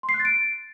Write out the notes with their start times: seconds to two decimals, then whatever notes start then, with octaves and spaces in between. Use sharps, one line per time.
0.03 C6
0.09 C7
0.14 F#6
0.20 A6
0.25 D7